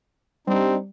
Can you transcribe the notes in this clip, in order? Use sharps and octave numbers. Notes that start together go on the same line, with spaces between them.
G3 C4 D4 D#4